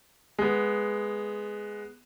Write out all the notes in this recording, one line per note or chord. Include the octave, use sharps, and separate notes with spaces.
G#3 B3